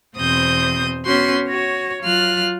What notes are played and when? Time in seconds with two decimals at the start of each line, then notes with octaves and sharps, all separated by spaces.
0.17 E2 B2 C4 C5 D#6 G6
1.05 B3 C#4 F#4 C6 G6
1.48 F#4 C#5
2.01 F#3 F4 F6 F#6